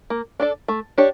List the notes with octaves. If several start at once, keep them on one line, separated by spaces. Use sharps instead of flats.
A#3
D4 A4 D5
A3
D4 G4 C#5